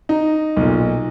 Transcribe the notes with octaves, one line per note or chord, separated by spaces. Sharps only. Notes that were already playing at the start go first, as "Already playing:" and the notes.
D#4
B1 A#2